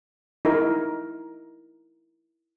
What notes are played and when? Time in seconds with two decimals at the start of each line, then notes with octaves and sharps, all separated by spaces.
0.45 D#4 E4 A#4